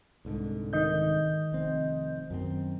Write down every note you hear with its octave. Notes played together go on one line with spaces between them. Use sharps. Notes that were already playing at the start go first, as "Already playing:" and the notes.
C2 G#2 D3
D#3 D#5 G6
F1 C4
F#2 D#3 C4